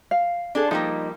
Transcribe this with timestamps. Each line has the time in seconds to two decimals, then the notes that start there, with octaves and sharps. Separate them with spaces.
0.11 F5
0.55 D4 G#4 A4
0.71 F3 G3 A#3 D#4